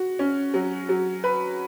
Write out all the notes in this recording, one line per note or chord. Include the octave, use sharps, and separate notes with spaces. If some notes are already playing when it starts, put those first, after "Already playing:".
Already playing: F#4
C#4
F#3
F#3
B4